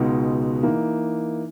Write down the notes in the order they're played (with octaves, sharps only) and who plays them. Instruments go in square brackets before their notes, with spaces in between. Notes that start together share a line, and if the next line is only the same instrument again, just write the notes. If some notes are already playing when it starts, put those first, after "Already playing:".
Already playing: [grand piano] C#2 B2 G#3 D#4 F#4
E3 A#3 D#4